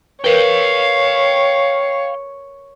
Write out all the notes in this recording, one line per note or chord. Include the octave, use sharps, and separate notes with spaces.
A#4 B4 C#5 F5 G5